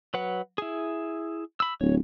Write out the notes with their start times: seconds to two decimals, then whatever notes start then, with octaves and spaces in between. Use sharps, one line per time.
0.14 F#3 B4 F#5
0.58 E4 G#4
1.60 B5 E6
1.81 D1 C#5